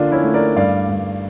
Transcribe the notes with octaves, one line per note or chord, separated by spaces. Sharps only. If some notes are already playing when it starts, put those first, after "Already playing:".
Already playing: D3 A#3 D4 F4
C#4 E4
A3
A#4 D5
G2 D5 F5
G2